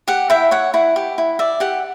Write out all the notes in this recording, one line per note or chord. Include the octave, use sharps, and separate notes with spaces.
G4 F#5
E4 E5 G5
C#5 F#5
E4 F#5
G4
E4
D5 E5
G4 F#5